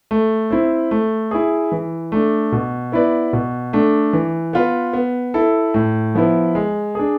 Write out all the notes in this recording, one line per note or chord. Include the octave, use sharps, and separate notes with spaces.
A3
C4 E4
A3
E4 G#4
E3
A3 D4
B2
B3 E4 B4 D5
B2
A3 D4
E3
B3 F4 B4
B3
E4 A4
A2
F3 B3 E4
G#3
D4 G#4